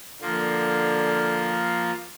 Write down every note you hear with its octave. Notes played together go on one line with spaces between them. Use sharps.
D3 F3 A#3